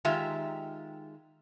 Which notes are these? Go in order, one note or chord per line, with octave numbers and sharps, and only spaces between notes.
D#3 G#3 F4 G4 E5 A#5